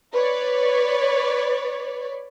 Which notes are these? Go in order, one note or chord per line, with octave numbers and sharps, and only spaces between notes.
B4 C#5 D5